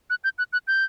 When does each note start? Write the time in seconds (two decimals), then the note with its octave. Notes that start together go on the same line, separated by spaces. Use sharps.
0.10 F#6
0.24 G6
0.38 F#6
0.53 F#6
0.67 G6